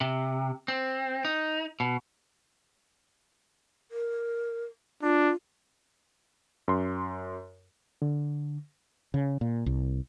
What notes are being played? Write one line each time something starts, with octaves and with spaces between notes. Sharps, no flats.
C3
C4
D#4
B2
A#4
D4 F4
F#2 C6
D3
C#3
A#2
C2